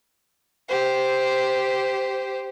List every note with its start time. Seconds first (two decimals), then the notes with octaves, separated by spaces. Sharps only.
0.68 G4 C5